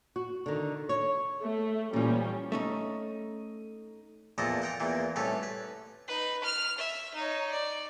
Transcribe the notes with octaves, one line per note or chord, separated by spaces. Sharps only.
F#4
D3 D#3
C#5
A3
A#2 E3 F3 G3 C#4
A3 C#4 D#4
E2 A#2 F3 A4 D#5 A5
F#5 G5 A#5
E2 A#2 E3
C2 A2 C#4 A4 B4
B4
D#4 B4
F6 F7
E5
D#4 C#5
D5